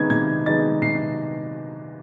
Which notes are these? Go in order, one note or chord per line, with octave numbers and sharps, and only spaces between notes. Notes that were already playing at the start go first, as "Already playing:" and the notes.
Already playing: C3 D#3 G#3 B3 D#4 G#6
C3 G#6
D#3 G#3 B3 D#4 A6
C3 C7